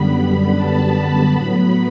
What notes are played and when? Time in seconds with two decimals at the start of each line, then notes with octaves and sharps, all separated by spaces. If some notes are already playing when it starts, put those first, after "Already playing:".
Already playing: F#2 D3 G3 B3 B5
0.55 A5
0.94 B5
1.31 A2 F#3 B3 B5